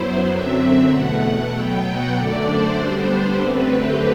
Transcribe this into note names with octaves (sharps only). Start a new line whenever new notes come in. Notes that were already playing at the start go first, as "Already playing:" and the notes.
Already playing: F#2 F#3 B3 E4 C5
F#2 D3 F#3 C4 E5
E2 B2 A3 F#5
B2 F#3 B3 G5
F#5
F#2 D3 A3 D4 D5
C5
D3 G3 B3 D4 C5
C5
F#2 D3 A3 C4 B4
G4